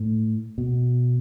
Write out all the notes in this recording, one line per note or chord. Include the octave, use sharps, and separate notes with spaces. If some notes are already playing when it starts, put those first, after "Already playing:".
Already playing: A2
B2